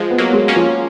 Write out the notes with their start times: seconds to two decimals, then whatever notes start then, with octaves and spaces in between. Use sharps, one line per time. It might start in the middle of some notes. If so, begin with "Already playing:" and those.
Already playing: F3 G#3
0.11 B3
0.18 F#3 A#3
0.33 G#3
0.48 A#3 C#4
0.56 F3